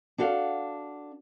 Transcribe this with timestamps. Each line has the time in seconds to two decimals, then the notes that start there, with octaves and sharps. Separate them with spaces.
0.18 D4 F#4 A4 F5